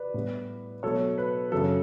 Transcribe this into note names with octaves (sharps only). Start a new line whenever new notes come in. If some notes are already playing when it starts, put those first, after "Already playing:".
Already playing: B4 D5
A2 G3 B3
B2 F#3 A3 A4 C#5
B4
F#2 C#3 F#3 A4